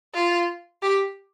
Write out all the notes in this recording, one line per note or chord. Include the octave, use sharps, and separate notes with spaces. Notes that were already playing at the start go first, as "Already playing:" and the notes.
F4
G4